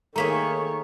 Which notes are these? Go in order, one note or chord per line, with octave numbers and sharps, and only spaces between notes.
D#3 A3 A#3 G#4 C#5 A#5 B6